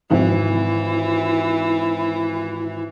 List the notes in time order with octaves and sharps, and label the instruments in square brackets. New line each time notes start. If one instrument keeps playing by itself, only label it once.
[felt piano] G#1 [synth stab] F2 C3 F3 [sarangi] E3 [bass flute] E4